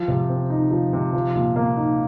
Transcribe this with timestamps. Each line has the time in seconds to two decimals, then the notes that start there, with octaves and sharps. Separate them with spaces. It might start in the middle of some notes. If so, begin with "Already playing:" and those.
Already playing: F3
0.08 C3
0.30 C4
0.50 D#4
0.71 F3
0.93 C3
1.13 F3
1.36 A#2
1.56 A#3
1.77 D#4